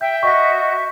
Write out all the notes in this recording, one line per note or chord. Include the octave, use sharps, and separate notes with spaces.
E5 G5 G6
F#4 D#5 C#6 B6